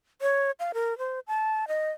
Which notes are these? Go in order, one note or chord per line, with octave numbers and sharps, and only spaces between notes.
C#5
F5
A#4
C5
A5
D#5